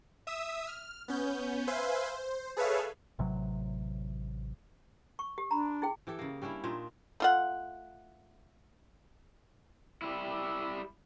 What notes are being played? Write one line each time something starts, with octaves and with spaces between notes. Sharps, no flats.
E5 D#6 E6
F6
B3 C#4 G6
B4 C5 E5 F5 G#5 C6
C5
G#4 A4 B4 C#5 E5 F5
A1 C3 F#3
C#6
G4
D4 A#5 B5
E4 G#4 G5
E3 G4 A4
C#3 A#3
G3 C#4 D4 E4
A#2 D4 D#4 F4
A3 F4 F#5
G3 E4